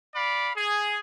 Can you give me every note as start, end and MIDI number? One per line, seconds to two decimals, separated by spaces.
0.15 0.50 74
0.15 0.50 77
0.15 0.50 83
0.55 0.99 68